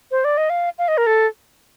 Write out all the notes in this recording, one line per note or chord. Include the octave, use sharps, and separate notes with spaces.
C5
D5
D#5
F5
F5
D#5
A#4
A4